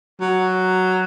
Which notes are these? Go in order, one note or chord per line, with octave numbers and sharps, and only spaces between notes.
F#3